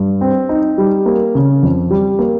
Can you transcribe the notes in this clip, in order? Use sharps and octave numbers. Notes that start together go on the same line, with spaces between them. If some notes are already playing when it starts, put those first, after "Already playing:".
Already playing: G2
C4
D#4
G3
A#3
C#3
F2
G3
A#3